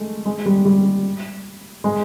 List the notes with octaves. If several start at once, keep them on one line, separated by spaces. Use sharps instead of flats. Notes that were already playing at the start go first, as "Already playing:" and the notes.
Already playing: G#3 A3
G#3
G3
G3
G#3